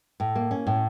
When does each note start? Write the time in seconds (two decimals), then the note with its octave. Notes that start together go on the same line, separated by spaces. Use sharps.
0.20 A2
0.36 A#3
0.51 C#4
0.67 A2